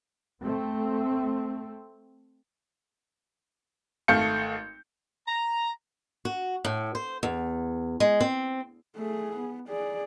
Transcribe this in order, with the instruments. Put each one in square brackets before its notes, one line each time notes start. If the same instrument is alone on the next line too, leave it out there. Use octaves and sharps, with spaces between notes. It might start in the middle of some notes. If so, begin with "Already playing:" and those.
[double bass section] A3 C4
[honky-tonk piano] G#1 A3 F5 G6 C#7
[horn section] A#5
[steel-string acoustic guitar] F#4
A2
C5
E2
G#3
C4
[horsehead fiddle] A3 G#4
B3
G#4 D5